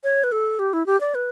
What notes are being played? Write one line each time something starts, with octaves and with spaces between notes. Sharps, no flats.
C#5
B4
A4
G4
E4
G4
D5
B4